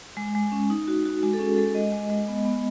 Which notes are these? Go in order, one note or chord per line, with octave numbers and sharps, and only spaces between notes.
G#3
G#3
C#4
D#4
F#4
F#4
G#3 F#4
A4
C#4 G#4
G#3 A4
G#3 D#5
G#3
G#3
B3
B3